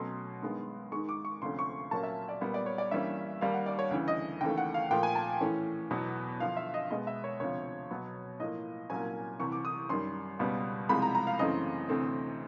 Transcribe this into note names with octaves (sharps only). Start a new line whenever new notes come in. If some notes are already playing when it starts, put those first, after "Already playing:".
Already playing: B2 F#3 A3 C#4 C6
G2 D#3 G#3 B3
G#2 D#3 G#3 C#6
D6
C#6
D2 C3 F3 A3 C#4 C6
C#6
A#2 F#3 A#3 C#4 A5
E5
D5
A#2 G3 B3
D5
C#5
D5
G2 E3 G3 A#3 C#4 E5
D#2 D#3 G3 A#3 F5
F#5
D5
C#5
D2 C#3 E3
D#5
D#2 C#3 E3 A3 G5
F#5
F5
A#2 F3 A3 G5
G#5
A5
A2 E3 A3 C#4
E2 B2 F#3 B3
G2 D3 F3 F5
E5
D#5
B2 G#3 B3 D#5
E5
C#5
D2 C3 F3 C#5
B2 F#3 B3
A2 F3 A#3 D#5
C2 A#2 F#3 A#3 C#4 G#5
C2 C3 E3 C#6
D6
D#6
F#2 D#3 G3 C6
C#2 B2 G3 B3
C2 C3 F3 G#3 B5
A#5
A#5
F5
F#2 C#3 E3 A3 C4 D#5
D2 C3 E3 A3 C4